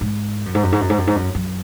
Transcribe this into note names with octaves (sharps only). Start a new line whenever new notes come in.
G#2
F#2
G#2
F#2
G#2
F#2
G#2
F#2
G#2
F#2
F#2